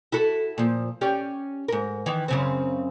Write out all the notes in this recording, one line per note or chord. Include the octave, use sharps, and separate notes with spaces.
E4 F#4 A4
A#2 F3
C#4 G4 D5
G#2 A#4
D#3 E3
F#2 C#3 C4